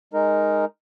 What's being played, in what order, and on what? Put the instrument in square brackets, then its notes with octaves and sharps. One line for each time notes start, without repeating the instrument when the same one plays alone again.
[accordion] G#3 D#4 A#4